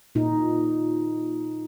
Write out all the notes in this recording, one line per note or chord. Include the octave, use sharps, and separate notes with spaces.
A#2 D#4